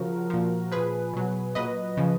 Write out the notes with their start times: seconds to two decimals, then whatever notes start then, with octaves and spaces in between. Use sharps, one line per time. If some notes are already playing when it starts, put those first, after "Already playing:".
Already playing: C#3 F3 F#4 A#4
0.30 A#2 F3
0.72 A#2 F3 G#4 B4
1.13 B2 F#3
1.55 A#2 F#3 B4 D#5
1.97 C#3 F3